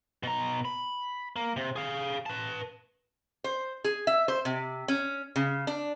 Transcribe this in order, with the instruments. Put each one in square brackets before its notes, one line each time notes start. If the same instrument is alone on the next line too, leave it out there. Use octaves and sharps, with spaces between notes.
[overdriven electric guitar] B2 A#5
B5
A#3
C3
G#4 F5
B4 A5
[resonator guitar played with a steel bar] C5
G#4
E5
C5
C3
C#4
C#3
D4